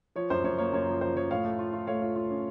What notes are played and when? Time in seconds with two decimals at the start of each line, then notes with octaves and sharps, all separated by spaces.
0.16 F3 C#5
0.30 F#2 C5
0.44 F#2 C#5
0.58 A#3 C#5
0.73 F#2 C#5
0.88 F3
1.01 F3 C5
1.16 F3 C#5
1.31 A2 C#5 F5
1.45 A3
1.59 F4
1.73 F4
1.87 A3 C#5 F5
2.02 F4
2.16 F4
2.30 C#4